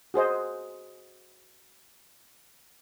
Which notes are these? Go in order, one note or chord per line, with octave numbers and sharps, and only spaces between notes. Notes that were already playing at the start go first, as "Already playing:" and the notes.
F#4 G#4 C5 D#5